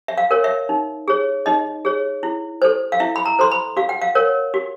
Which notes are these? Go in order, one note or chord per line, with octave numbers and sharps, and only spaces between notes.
E5
F5
A#4 C#5
E5
D#4
G#4 C#5
D#4 D#5
G#4 C#5
E4
A4 C5
F5
E4 E5
B5
A#5
A4 C5 C6
B5
F#4 F5
F#5
F5
A#4 C#5
F#4